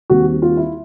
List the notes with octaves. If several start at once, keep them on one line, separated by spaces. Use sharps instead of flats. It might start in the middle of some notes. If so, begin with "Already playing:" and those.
D#2 D#3 G3 C4 F#4
F4
E4